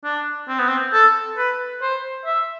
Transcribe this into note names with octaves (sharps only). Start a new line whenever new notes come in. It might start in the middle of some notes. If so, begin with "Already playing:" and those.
D4
C4
B3
C4
A4
B4
C5
E5